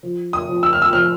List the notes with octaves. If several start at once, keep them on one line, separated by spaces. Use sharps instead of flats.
F3
D#6
F3
E6
F6
E6
F3 F6